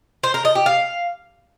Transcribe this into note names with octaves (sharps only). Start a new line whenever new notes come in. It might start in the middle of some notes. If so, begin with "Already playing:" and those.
C5
A#4
D#5
G4
F5